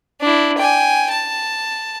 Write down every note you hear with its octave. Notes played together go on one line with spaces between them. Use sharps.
D4 E4
G5 G#5
A5